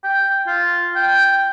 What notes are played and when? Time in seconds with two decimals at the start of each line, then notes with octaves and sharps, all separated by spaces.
0.04 G5
0.47 F4
0.96 G5